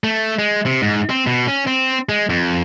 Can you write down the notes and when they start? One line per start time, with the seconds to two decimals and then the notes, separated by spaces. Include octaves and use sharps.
0.04 A3
0.39 G#3
0.66 C3
0.82 G#2
1.10 C4
1.27 B2
1.48 C#4
1.67 C4
2.09 G#3
2.30 F2